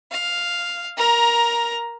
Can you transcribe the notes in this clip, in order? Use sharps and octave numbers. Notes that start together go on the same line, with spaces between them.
F5
A#4 A#5